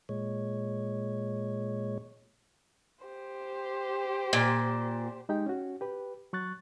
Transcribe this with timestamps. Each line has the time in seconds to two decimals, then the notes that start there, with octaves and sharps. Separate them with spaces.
0.09 A#2 G#3 C#5
3.05 G4 C5
4.33 A#2
5.29 G#3 D#4 G4 G5
5.46 C#4 F#4
5.81 G4 B4
6.33 F#3 C#6 F#6 A6